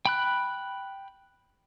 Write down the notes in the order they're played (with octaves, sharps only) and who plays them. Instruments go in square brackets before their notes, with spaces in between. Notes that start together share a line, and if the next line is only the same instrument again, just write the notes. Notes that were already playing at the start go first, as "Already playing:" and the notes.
[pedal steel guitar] G5 B5 F#6